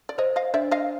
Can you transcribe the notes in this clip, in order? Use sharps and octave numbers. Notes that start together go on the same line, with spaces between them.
D5
C5 C#5 D#5
D#5 F5
D4 D5 E5
D#5 F5